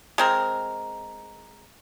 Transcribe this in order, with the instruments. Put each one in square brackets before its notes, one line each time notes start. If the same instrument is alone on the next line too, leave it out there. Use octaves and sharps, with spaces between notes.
[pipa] G#3 C4 A#4